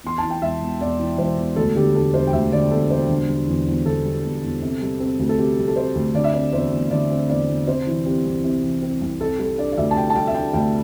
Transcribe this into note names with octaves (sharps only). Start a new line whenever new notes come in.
E2 C6
E3 A5
G5
E1 E5
E1
E2 D5
E3
E1 C5
E1
D2 A4
D3 G4
E1 A4
E1 C5
G5
D2 E5
D3 D5
E1 A4
E1 C5
D3
G3
E2
E2
D3 A4
G3
E2
E2
C3
G3
C4
D2
A4
C3 G4
G3
A4
C4 C5
D2
D3 D5
E5
C4 D5
E2 C5
E2
D3 D5
C4
E2 D5
E2
C3 C5
E3
C4 G4
C2
C3
E3
C4
C2
C3 A4
G3 A4
D4 D5
D5
D2 E5
A5
C3 G5
A5
G3 G5
E5
D4 G5
D2 G5